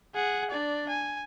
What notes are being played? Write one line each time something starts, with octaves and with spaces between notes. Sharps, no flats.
G#4 F#5
D4 D5
G#5